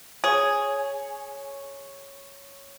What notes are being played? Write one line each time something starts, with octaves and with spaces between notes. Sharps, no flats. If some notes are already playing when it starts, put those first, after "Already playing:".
G#4 C#5